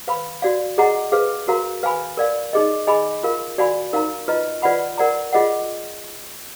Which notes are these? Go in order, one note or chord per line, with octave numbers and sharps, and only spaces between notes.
B4 F5 B5
F#4 D5 F5
G#4 D#5 F#5 A#5
G#4 B4 F5
F#4 A#4 F5 A#5
B4 F5 G#5 B5
A#4 D5 F5
D#4 G#4 D#5
G#4 D#5 G#5 B5
F4 A#4 F5
F#4 D5 F5 G#5 B5
D#4 A#4 F5 A#5
F4 B4 D#5 A#5
F4 B4 D5 F#5 B5
A#4 D5 F#5 A#5
F4 G#4 D#5 F#5